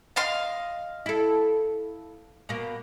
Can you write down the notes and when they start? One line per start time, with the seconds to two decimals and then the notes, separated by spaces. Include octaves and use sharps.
0.16 D#5 F5 C6
1.06 E4 A4
2.49 B2 A#3